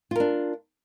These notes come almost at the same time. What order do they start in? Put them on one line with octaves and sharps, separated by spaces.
F4 A#4 D4